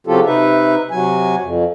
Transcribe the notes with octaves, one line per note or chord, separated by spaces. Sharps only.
C#3 F#3 C4 F4 G4 A4
C3 D#4 B4 E5
C3 F#3 G#5
F2